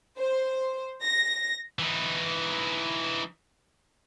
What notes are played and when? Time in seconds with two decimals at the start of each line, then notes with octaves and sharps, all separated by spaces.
0.19 C5
1.03 A#6
1.79 E3 D#4